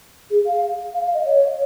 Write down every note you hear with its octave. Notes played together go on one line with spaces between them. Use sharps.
G#4
F5
F5
F5
D#5
C#5